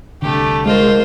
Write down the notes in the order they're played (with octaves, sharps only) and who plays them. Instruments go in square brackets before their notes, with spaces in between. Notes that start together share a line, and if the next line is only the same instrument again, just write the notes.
[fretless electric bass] C2 D3 [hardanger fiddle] A3 G4
[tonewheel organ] G#3 [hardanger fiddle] F4 C5 [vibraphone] A#4 D#5